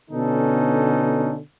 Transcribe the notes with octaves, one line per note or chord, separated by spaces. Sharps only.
B2 D3 B3 C#4 D#4 A4